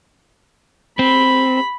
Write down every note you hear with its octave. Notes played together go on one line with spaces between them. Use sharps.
C4 B5